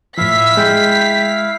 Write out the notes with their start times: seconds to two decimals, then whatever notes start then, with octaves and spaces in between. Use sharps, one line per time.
0.18 A2 F3 E4 E5 F5 B6
0.57 G#3 G5